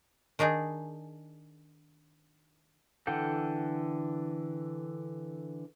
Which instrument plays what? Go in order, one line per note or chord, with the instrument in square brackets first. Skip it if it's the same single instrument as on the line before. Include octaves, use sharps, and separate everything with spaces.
[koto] D#3 D4 D#4 G#4
[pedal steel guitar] D3 E3 A4 F#5 G5